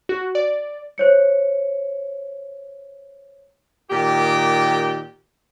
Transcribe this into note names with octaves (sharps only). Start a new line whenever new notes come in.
F#4
D5
C5 C#5 C#7
A#2 D#3 G4